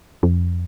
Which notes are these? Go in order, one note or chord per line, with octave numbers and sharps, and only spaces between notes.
F2